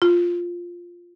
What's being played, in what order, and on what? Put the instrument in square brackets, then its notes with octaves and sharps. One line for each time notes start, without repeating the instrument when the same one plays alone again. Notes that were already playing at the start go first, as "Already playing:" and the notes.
[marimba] F4